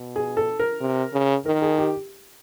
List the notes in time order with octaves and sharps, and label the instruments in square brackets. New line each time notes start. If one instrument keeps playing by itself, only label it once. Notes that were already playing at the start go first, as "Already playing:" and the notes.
Already playing: [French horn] B2
[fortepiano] G#4
A4
A#4
[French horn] C3
C#3
[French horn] D#3 [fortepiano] A#4
[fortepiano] G#4
G4